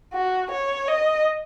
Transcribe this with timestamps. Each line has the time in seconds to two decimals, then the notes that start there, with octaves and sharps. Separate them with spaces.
0.13 F#4
0.51 C#5
0.88 D#5